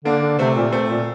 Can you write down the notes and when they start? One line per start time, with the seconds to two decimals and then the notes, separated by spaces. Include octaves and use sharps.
0.04 D3 A#3 D4
0.22 D3
0.38 C3 A3 C4
0.55 A#2
0.72 A3 C4
0.89 A#2